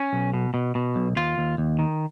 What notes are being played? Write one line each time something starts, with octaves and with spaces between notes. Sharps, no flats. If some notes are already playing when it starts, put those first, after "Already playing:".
Already playing: C#4
B1
B2
B2
B2
B1
D#2 F4
D#2
D#2
D#3